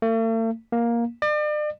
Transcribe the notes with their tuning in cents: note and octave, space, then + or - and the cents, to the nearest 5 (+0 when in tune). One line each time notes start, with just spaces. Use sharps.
A3 +45
A#3 +10
D5 +40